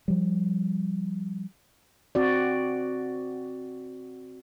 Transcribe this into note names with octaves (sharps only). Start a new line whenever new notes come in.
F3 G3
C4 F#4 D5